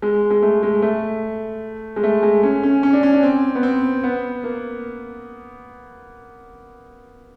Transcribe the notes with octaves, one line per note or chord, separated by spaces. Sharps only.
G#3
G#3
A3
G#3
A3
G#3
A3
G#3
C#4
C#4
C#4
D4
C#4
D4
C4
B3
C4
B3
A#3